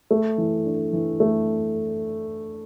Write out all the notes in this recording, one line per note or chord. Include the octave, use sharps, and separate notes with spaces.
A3
E3
D4
E3
A3